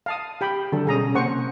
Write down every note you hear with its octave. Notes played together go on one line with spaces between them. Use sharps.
F5 A5 D#6
G4 G5 B5
D3 F#3 A4
B2 G3 C#4 G#4 A#5 D#6
C3 A#3 C5 F#5 C#6